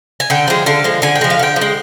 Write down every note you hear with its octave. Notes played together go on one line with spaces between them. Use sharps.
G#5
D3 G5
F3 G#3
D3 F5
F3 G#3
D3 G#5
G5
F3 G#3
F5
D3 G5
F3
G#3